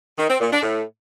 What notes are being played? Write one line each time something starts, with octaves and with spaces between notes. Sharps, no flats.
D#3
C4
A#2
D4
A2